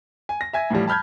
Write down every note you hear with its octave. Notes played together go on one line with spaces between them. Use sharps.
G#5
A#6
E5 G#5 G#6
A2 E3 F3 G3
A5 B5 F6 G6 G#6